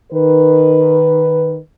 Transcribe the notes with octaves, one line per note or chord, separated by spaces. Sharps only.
D#3 B4